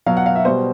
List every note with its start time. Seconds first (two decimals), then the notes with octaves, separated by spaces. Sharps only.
0.06 B2 F#3 F5
0.17 F#5
0.26 F5
0.35 E5
0.45 B2 G3 C5